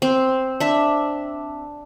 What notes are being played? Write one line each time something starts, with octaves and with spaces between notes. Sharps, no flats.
C4
D4 E5